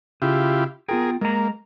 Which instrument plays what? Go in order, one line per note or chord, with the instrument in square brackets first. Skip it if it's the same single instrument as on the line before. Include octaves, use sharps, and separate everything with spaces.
[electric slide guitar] C#3 [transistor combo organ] E4 F4 G4
[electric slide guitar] B3 F4 G5 [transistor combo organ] G#4 A#4
[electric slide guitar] G#3 A#5 [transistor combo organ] A#3